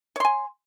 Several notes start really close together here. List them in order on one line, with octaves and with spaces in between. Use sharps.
C#5 C6 G#5